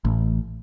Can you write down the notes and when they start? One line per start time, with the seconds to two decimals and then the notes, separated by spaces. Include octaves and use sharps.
0.05 A1